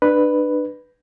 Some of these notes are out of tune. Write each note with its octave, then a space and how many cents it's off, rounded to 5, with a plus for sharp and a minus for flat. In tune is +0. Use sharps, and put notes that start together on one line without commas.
D4 +30 B4 +0